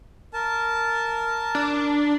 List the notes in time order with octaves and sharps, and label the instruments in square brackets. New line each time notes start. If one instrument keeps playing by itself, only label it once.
[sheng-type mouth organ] A#4 A5
[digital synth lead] D4